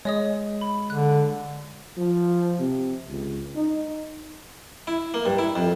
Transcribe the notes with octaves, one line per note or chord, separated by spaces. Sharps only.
G#3 C#5 D#5 D#6
B5
D3 F#6
F3
C3
C#2
D#4
E4
A#3
G2
E4
F2